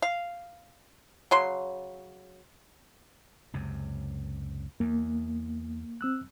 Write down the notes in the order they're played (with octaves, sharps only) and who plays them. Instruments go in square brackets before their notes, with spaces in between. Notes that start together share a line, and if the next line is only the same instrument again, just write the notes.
[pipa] F5
C#3 F#3 C6
[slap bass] C#2 F#2 C3
[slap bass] E2 [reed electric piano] A#3
[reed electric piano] C4 E6 F#6